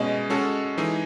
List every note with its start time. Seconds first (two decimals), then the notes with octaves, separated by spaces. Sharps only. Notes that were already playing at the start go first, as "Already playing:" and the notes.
Already playing: B2 G#3 C#4 D#5
0.30 G#3 C#4 F#4 A4
0.78 E3 G#3 D#4 G#4